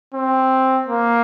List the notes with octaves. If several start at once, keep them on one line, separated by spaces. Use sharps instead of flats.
C4
A#3